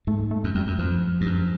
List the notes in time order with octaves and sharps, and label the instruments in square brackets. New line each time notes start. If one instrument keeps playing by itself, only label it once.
[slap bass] G#2 [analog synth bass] A3
[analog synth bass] A3
[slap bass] F#2
[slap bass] F2 [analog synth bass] G3
[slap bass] F#2
[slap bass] F2 [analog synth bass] F3
[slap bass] G2
F#2